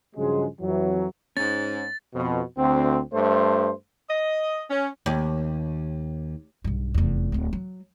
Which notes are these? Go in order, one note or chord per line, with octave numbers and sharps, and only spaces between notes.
G2 C#3 F3 F#3 G#3
F2 E3 F#3
G#2 C#4 A6
F2 B2
D2 C4
G2 A3 C5
D#5
C#4
D#2
B1 G2
F1 E2
D1 C4
F#3